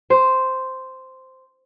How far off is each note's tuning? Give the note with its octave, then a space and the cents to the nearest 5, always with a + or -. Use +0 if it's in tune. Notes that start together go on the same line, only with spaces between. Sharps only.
C5 -5